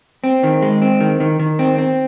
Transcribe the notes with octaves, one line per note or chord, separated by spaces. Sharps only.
C4
D#3
G#3
C4
D#3
D#3
D#3
C4
C4